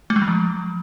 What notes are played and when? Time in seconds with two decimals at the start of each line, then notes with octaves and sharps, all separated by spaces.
0.10 A3
0.16 G#3
0.22 F#3
0.28 F3